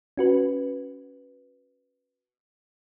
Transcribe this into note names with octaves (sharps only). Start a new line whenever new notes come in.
C#4 F#4 B4